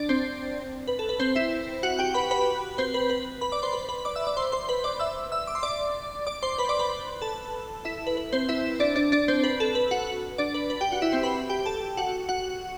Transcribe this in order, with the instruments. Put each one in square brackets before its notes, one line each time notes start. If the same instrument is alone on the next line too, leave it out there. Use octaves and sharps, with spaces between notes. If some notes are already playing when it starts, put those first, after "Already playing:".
Already playing: [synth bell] D4 D5
C4 C5
B4
A4
B4
C4 C5
E4 E5
F#4 F#5
G4 G5
B4 B5
B4 B5
C4 C5
B4
B4
B4 B5
D5 D6
C5 C6
B4 B5
B4 B5
D5 D6
E5 E6
D5 D6
C5 C6
C5 C6
B4 B5
D5 D6
E5 E6
E5 E6
D6
C6
D5 D6
D5 D6
C5 C6
B4 B5
D5 D6
B4 B5
A4 A5
E4 E5
B4
B4
C4 C5
E4 E5
D4 D5
D4 D5
D4 D5
C4 C5
B4
A4
B4
F#4 F#5
D4 D5
B4
B4
G4 G5
F#4 F#5
E4 E5
C4 C5
B4 B5
G4 G5
A4 A5
F#4 F#5
F#4 F#5